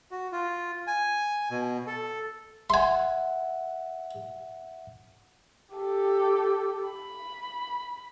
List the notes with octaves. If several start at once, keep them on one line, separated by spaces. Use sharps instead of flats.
F#4
F4
G#5
B2
A4
E5 F#5 G#5 C6
G4 A4
B5